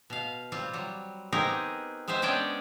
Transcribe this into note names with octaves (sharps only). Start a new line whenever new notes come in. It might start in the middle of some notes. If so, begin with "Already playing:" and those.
B2 F5
G3 C4 F4
F#3 G3
B3 C4 D#4 G4 G#4 A#4
G#3 B3 C4 C5 E5
G#3 B3 C#4 D4 D5 G5